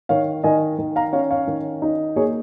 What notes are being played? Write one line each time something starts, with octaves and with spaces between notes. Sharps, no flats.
D#3 C#5 F5
D#3 D#5 G#5
D#3
F5 A#5
C#4 C#5 F5
C#5 F5
D#3
D#4
A#3 G#4 C#5